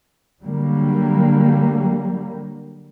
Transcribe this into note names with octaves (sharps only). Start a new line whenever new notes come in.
D3 F#3 G3 A#3